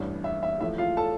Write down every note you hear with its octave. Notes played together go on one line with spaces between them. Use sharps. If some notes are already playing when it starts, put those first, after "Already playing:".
Already playing: A1 G2 E3
E5
E5
A1 A2 F3 A3 E5
F4 F5
A4 A5